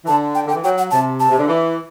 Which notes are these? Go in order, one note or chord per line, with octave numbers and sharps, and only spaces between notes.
E3
D3 A5
G5
D3 G5
E3
F#3 G5
F#5
C3 A5
A5
C3
D3
E3